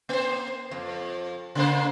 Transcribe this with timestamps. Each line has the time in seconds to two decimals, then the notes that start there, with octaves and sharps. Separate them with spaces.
0.09 A#3 C5
0.71 F2
1.55 C#3 A#3 C5